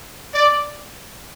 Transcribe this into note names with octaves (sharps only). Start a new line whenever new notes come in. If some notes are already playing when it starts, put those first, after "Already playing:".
D5